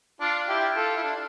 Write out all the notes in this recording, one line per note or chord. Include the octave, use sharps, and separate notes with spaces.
D4 F4
E4 G4
F4 A4
E4
D4